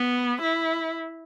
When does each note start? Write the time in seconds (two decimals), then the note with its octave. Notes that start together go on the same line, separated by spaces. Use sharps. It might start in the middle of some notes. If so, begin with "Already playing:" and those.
Already playing: B3
0.42 E4